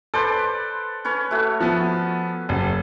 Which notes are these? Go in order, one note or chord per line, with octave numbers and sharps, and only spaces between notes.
A4 B4 C5 D5
C#4 B4 C#5
A3 F#4
F3 B3
F#1